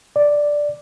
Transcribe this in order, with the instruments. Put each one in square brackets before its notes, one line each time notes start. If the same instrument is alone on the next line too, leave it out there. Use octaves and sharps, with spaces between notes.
[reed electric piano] D5